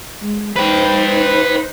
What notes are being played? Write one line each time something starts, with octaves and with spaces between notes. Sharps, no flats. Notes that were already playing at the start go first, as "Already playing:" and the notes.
G#3
D#4 B4 C5 G5